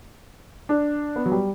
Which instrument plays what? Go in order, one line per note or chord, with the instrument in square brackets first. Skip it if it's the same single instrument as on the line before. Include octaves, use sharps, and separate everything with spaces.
[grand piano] D4
B3
F#3
G3